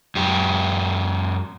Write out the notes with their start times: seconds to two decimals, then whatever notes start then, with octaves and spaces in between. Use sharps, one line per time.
0.15 F#2 G4